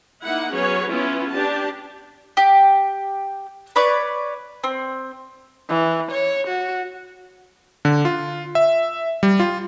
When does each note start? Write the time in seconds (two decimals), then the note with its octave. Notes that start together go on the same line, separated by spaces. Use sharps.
0.22 A#3 D#4 E4 F#5
0.53 F#3 B3 C#4 G#4 C#5
0.89 B3 C#4 E4 F4
1.30 D4 G4 A5
2.37 G4
3.76 B4 C#5 D5
4.64 C4
5.69 E3
6.12 C#5
6.47 F#4
7.85 D3
8.05 F4
8.55 E5
9.23 G3
9.40 F4